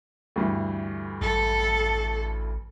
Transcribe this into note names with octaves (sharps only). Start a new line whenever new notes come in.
D2 G2 E3
A1 A4